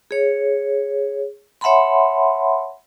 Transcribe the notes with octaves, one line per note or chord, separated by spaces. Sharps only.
G#4 C#5
C#5 E5 F#5 A5 B5 C6